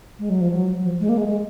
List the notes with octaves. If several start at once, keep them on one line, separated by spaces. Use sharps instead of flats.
G#3
F#3
F3
F#3
F3
G#3
A#3
G#3
G#3